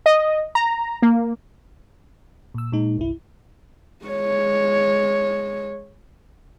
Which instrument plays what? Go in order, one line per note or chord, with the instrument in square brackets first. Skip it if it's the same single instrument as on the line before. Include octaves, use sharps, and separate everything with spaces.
[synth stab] D#5
A#5
A#3
[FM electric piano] A#2 E6
A#2 G#3 D#4
G1 C2 E4
[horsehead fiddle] G#3 C#5